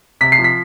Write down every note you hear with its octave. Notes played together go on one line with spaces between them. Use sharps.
C3 B6
C7
F3
B6